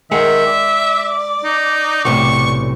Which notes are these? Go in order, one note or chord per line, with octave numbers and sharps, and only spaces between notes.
D#3 G#3 G#4 E5 F#5
D5
D#4
B1 A2 C3 C#6